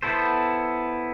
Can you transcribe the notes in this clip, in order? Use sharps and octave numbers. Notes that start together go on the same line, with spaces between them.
B3 E4 A4 C5